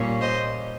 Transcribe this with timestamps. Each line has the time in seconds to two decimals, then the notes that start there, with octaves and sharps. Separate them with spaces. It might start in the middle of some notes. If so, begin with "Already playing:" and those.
Already playing: A#2 G3 C#4
0.21 C5 D#5